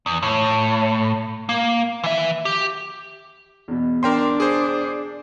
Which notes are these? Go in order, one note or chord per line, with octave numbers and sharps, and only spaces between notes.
E2
A2
A#3
E3 E5
G4
E2 B2
D4 A#4 G5 C6
G#4 C5